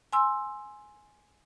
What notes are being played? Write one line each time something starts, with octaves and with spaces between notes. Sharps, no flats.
G#5 C6 E6